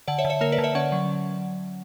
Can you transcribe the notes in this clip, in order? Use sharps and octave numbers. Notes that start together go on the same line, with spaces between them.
D3 D5 F#5
C#5 E5
D3
C#5 E5
A#3 A#4 C#5
B4 D5
D3
C#5 E5
C#4 D5 F#5
F#3